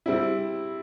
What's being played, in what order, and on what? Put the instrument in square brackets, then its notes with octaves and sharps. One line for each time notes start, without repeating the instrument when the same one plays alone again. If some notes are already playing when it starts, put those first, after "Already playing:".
[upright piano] G3 C4 E4